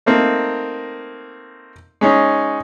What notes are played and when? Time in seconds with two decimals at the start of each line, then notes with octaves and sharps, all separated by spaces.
0.06 A3 A#3 C4 D#4
2.01 G#3 C#4 D#4 C#5